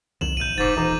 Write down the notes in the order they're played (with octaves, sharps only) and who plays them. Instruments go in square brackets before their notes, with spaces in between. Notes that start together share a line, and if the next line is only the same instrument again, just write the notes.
[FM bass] C2 [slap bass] F2 D3 D#3 [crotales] E7 F#7
[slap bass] A1 B2 [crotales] G6 D#7
[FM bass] F1 [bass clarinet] G#2 [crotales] D6 A6
[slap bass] D#1 [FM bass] E3 [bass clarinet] D#4